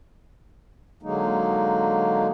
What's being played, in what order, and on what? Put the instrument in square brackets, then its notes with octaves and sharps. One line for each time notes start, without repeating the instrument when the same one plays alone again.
[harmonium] D3 F#3 G#3 A#3 D#4